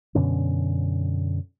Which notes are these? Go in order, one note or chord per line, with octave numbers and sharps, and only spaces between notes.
F#2 B2 D3 C#4